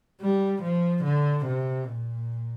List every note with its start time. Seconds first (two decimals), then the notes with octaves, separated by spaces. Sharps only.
0.21 G3
0.63 F3
1.04 D3
1.46 C3
1.87 A#2